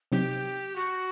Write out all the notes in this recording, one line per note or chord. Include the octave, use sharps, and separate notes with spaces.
C3 F#3 C4 D#4 G4
F#4